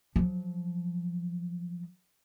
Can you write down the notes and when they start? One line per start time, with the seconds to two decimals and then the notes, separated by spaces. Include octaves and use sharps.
0.16 F3 F#3